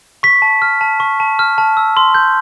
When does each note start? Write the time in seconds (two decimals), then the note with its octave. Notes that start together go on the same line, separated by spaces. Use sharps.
0.23 C#6 B6
0.42 A5
0.62 F6
0.81 A5
1.00 C#6
1.20 A5
1.39 F6
1.58 A5
1.77 E6
1.97 C6
2.15 G6